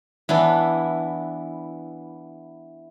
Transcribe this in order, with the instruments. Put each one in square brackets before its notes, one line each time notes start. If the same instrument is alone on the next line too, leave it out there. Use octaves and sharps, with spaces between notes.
[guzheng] E3 B3 D4 E4